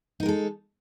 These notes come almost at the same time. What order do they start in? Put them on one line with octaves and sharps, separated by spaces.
D#4 A#4 G#3 A4